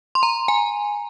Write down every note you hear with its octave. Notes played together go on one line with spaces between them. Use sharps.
C6
A#5
G#5